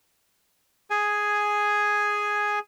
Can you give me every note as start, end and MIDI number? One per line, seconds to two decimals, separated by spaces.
0.90 2.59 68
0.90 2.59 80